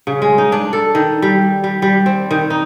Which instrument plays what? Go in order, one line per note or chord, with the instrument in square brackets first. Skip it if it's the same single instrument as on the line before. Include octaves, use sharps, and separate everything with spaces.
[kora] C#3
G#3
D#4
D4
A4
D#3
G3
G3
G3
C4
D#3
D#4